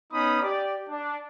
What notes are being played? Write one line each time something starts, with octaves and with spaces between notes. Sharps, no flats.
B3 C#4 D#4 B5 D#6
G4 D5
D4